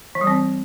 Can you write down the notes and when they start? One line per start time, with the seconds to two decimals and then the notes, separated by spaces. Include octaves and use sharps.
0.15 E3
0.21 G3
0.27 C4